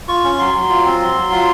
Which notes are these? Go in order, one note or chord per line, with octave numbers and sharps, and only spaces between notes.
F4 C#6
C#4
F#3 C6
F#3
F4
C4
F#3
F#3
F4